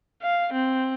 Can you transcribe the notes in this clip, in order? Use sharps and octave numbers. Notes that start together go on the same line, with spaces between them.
F5
C4